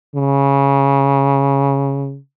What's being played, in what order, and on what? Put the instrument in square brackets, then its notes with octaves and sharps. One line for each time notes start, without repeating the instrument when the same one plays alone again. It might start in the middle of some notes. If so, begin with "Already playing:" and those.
[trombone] C#3